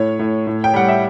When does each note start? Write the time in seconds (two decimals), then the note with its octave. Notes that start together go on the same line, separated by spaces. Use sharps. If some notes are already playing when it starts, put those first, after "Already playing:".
Already playing: A2 C#5
0.19 A2
0.47 A2
0.64 G5
0.74 G3 F#5
0.88 E5